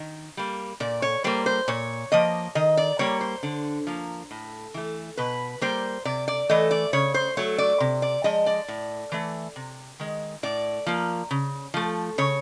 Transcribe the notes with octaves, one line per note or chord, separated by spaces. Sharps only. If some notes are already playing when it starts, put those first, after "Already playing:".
Already playing: D#3
G3 A#3
A#2 D5
C#5
G3 A#3 C5
C5
A#2 C#5
F3 A#3 D#5
D#3 D#5
D5
G3 A#3 C#5
C5
D3
F3 A#3
A2
E3 A3
B2 B4
G3 A#3 C5
C3 D5
D5
E3 A3 D#5
D5
C#3 C#5
C5
F#3 A3 C#5
D5
C3
D5
F3 G#3 D#5
D5
A2
E3 A3
C3
D#3 G#3
A2 D5
F3 A#3
C#3
F3 A3
C#3 C#5